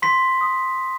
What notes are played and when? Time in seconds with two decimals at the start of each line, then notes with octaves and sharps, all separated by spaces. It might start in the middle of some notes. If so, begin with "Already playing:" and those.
0.02 C6 B6
0.41 D#6